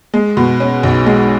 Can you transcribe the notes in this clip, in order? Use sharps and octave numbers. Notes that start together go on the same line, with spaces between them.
G#3
B2
C#4
B1
G#3